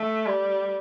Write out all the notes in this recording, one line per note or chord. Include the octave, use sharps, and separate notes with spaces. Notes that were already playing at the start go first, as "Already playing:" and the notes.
Already playing: A3
G3